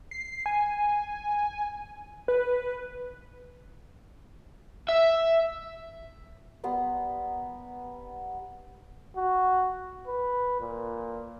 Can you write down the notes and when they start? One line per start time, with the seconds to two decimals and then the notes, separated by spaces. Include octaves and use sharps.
0.11 C7
0.46 G#5
2.28 B4
4.89 E5
6.64 G3 B3 A#5 C6
9.17 F#4
10.07 B4
10.60 A#2